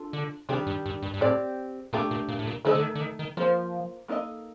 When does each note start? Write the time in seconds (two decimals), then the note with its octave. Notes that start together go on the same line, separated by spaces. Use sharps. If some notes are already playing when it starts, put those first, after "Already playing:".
Already playing: D4 F4 A4
0.13 D3
0.49 C3 D#3 G3 D4 G4
0.67 G2
0.86 G2
1.02 G2
1.14 G2
1.21 A2 C4 G4 D5
1.93 A#2 A3 D4 G4
2.11 A#2
2.28 A#2
2.39 A2
2.47 A#2
2.65 D3 A3 D#4 A4 C5 D#5
2.75 D3
2.82 D#3
2.95 D3
3.01 D#3
3.19 D#3
3.37 F3 A#3 F4 C5
4.08 A#3 D#4 A4 C5 D#5